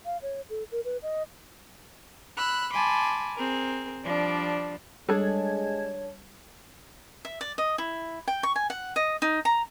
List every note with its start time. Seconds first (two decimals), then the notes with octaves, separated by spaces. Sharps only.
0.05 F5
0.22 C#5
0.50 A4
0.72 A#4
0.85 B4
1.03 D#5
2.37 B5 E6 F#6
2.72 G#5 A5 B5 C6 D6
3.37 C4 G#4 A#4
4.05 F3 G3 D4
5.09 G3 G#3 D4 G#4 A4 C#5 A5 G#6
7.25 E5
7.41 D5
7.58 D#5
7.78 E4
8.28 G5
8.43 C#6
8.56 G#5
8.70 F#5
8.96 D#5
9.22 D#4
9.45 A#5